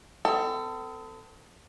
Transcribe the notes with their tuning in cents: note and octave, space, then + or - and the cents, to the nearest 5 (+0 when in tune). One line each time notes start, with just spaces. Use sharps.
C4 -45 A4 +20